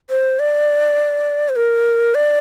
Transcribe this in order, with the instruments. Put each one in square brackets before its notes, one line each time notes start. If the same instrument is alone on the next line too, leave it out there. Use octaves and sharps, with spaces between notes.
[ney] C5
D5
C5
A#4
D5